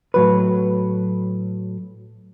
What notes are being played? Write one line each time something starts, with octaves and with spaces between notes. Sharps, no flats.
A2 F#3 B4